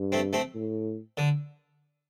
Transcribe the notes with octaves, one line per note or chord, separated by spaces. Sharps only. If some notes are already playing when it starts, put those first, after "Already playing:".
Already playing: G2
A3 C4
A3 C4
A2
D3